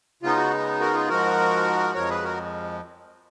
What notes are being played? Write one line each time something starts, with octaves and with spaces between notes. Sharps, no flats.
C#3 G#3 B3 D#4 F4
F#4
F#4 A#4
F4 G#4
G#2 F3 G#3 F#4 A#4
F2 F3 G#3 A#4 C#5
G#4 B4
F#4 A#4